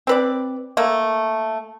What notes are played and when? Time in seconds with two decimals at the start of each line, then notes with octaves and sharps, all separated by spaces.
0.07 C4 B4 D5
0.77 A3 A#3